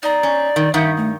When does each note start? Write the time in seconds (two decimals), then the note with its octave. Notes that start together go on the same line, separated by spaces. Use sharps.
0.03 D#4 D5 A#5
0.23 C#4
0.56 D#3
0.74 G2 D#3 E5 F#5 D#6 G6
0.97 A3